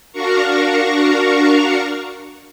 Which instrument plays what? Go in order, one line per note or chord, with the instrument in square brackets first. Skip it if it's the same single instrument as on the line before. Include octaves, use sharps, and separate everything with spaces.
[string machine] D4 F#4 A#4 F5 A#5 C#6